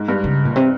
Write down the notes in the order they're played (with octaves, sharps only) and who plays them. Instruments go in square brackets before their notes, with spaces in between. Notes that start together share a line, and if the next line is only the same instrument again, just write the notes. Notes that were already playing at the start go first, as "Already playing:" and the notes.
Already playing: [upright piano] G#2
G2
[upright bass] C#3
A#2
C3